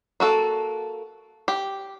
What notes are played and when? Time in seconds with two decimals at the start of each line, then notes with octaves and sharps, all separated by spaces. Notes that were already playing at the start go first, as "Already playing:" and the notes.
0.20 A#3 F#4 A4
1.48 G4